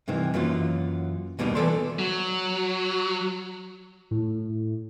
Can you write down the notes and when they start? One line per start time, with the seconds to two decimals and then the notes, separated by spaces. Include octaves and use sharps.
0.08 G2 C3 D#3 E3
0.34 F#2 E3 F#3 A#3 F4
1.39 D#2 B2 G3 A#3 D#4
1.55 E3 B3 E4 A4 D5 C6
1.99 F#3
4.11 A2